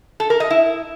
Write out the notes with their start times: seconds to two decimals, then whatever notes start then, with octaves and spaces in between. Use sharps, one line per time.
0.20 A4
0.30 A#4
0.40 D#5
0.50 E4